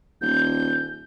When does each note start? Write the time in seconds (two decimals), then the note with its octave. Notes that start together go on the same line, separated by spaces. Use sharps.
0.21 D#1 G6